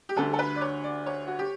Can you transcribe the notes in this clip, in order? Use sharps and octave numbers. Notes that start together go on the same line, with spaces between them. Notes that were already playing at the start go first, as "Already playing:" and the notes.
G4
D2 D3 G3 A4
A4
B4
D5
C#5
D5
C#5
F#4
G4